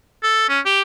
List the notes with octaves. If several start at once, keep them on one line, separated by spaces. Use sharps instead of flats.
A4
C#4
G4